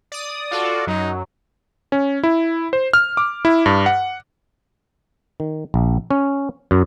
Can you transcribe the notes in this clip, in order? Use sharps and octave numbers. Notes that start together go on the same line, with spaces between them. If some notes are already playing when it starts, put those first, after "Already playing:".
D5 D#6
F4 F#4 A4 D5
F#2 F#3 D#4
C#4
E4
C5
F6
D6
E4
G2
F#5
D#3
A#1
C#4
F#2